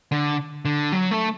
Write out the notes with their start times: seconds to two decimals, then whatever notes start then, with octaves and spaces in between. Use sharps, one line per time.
0.12 D3
0.65 D3
0.92 F#3
1.11 A3